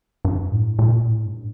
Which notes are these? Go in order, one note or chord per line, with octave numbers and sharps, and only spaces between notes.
G2
A2
A#2
A2
G2